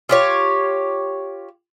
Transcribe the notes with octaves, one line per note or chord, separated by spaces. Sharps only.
F4 G4 C#5